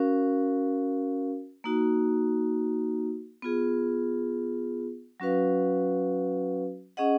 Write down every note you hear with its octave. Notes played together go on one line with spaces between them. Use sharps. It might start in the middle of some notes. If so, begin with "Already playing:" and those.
Already playing: C#4 F#4 A#4 F5
A#3 D#4 F#4
B3 F4 G#4
F#3 C#4 F#4 B4 F5
C#4 G#4 D#5 F#5